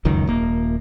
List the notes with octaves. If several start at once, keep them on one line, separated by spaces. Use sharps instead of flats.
F1 C#2 F#2 D#3
D#1 A#3